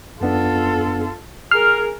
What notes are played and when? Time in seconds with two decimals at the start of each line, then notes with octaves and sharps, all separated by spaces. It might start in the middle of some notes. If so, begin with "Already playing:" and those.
0.21 F#2 B3 D4 F4 A4
1.51 G#4 A#4 F6 C7